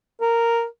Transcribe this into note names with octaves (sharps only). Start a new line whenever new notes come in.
A#4